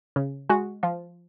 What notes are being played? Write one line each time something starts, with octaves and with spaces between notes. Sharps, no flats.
C#3
G#3 F#4
F3 F4